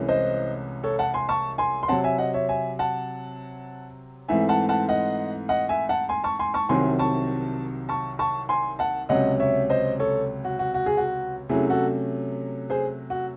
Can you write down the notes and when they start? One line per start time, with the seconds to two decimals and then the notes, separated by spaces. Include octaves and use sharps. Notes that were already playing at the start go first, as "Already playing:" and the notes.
Already playing: C2 C3 E3 G#3 C#4
0.09 C5 D#5
0.84 A4 C#5
0.99 F#5 A5
1.14 G#5 C6
1.29 A5 C#6
1.58 G#5 C6
1.83 C6
1.88 C3 F#3 C4 F#5 A5
2.04 E5 G#5
2.18 D#5 F#5
2.34 C#5 E5
2.49 E5 G#5
2.79 F#5 A5
4.29 G#2 E3 A3 C4 E5 G#5
4.49 F#5 A5
4.69 F#5 A5
4.89 D#5 F#5
5.49 D#5 F#5
5.69 E5 G#5
5.89 F#5 A5
6.09 G#5 C6
6.24 A5 C#6
6.39 G#5 C6
6.54 A5 C#6
6.69 C2 C3 D#3 F#3 C4 G#5 C6
6.99 A5 C#6
7.89 A5 C#6
8.19 A5 C#6
8.49 G#5 C6
8.79 F#5 A5
9.09 C#2 C3 F#3 C#4 D#5 F#5
9.40 C#5 E5
9.70 C5 D#5
10.00 A4 C#5
10.45 F#4
10.59 F#4
10.74 F#4
10.86 G#4
10.97 F#4
11.49 C3 F#3 A3 C#4 E4 G#4
11.70 F#4 A4
12.70 G#4 C5
13.10 F#4